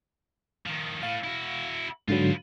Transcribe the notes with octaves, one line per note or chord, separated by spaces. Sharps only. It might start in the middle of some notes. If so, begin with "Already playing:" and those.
D#3 F3
A2 F5
E4 F#4
G#2 D3 F#3 F4 B4